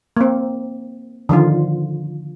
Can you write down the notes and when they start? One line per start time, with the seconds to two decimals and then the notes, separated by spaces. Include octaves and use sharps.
0.17 A#3 C4
1.29 D3 D#3 F3 F4